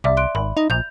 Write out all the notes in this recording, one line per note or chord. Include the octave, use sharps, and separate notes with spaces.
C2 D5 E5 D6
C6 F#6 D7
G#1 B5
D#4
A#1 G6 F7